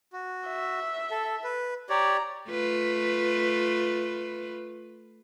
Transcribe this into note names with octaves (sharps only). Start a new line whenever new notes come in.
F#4
E5
A4
B4
G4 C#5 D5 A#5
A3 F4 B4